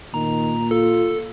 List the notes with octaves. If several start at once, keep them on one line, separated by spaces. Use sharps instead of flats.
A#2 D#3 A#5
F4 A4